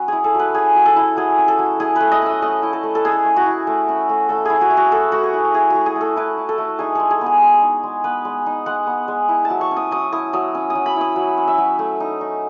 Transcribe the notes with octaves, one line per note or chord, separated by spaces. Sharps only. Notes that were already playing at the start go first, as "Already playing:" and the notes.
Already playing: F#3 C#4 B4
E4 G#4
A4
F#3 B4
C#4 G#4
F#3
A4
E4
F#3 G#4
C#4
A4
F#3
E4 G#4
A3 B4
D#5
C#4 E5
A3 D#5
E4
A4
A3
A4
C#4 G#4
A3
F#4
E4
A3
C#4
A3
A3 A4
E4 G#4
F#4
E4
F#4
A3 A4
A3 F#4
G#4
E4
E4 G#4
A3 F#4
G#4
A3 A4
E4 B4
E4
A4
A3
D#4 G#4
G#3 A4
G#4
B3
G#4
G#3
D#4
G#3
B3 B4
G#3
D#4
G#3 F#5
B3
G#3
E4
A5
F#3
C#6
C#4
D#6
F#3 D#6
E4 D#6
F#3 D#6
C#4
D#6
F#3
B5
E4 D#6
F#3
C#4
E5
F#3
A3
D#4
D#4